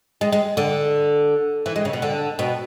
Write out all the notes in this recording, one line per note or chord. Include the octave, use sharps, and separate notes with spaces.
G#3
G#3
D3
E3
G#3
C#3
B2
D3
B2